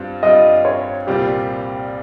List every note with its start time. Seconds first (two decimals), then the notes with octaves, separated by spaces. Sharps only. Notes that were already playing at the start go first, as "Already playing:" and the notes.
Already playing: G2 G3 C4 F4
0.23 G2 G3 C4 F4 D#5
0.65 C#5
1.07 C2 A#2 G3 C4 F4 G4